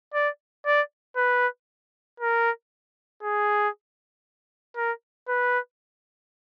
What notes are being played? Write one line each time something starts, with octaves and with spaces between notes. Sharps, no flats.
D5
D5
B4
A#4
G#4
A#4
B4